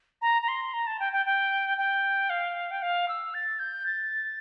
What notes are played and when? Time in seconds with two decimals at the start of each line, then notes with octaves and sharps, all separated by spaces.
0.21 A#5
0.42 A#5
0.48 C6
0.73 A#5
0.87 A5
1.00 G5
1.12 G5
1.26 G5
1.78 G5
2.30 F5
2.71 G5
2.82 F5
3.08 E6
3.34 A6
3.59 G6
3.86 A6